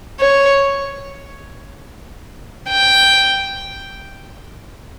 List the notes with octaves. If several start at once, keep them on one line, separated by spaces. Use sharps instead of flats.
C#5
G5